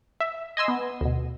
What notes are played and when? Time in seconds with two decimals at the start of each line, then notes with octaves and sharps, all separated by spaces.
0.20 E5
0.57 D#5 G#5 C6 E6
0.68 B3
1.01 D2 B2